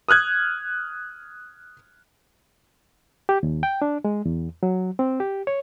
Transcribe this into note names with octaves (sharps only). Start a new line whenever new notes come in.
D#6 F6 F#6 G#6
G4
D#2
G5
D4
G#3
E2
F#3
C4
G4
C#5